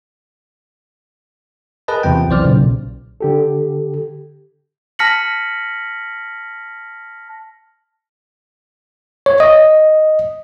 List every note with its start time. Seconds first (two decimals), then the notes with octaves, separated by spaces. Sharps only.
1.88 G#4 A#4 B4 D#5 A5
2.03 E2 C3 F3 G5
2.29 B1 E3 C5 D5 F6
2.44 B1 A#2 C#3
3.21 D3 G4 A4
4.99 A5 F6 A#6 B6 C#7 F#7
9.26 C#5
9.40 D#5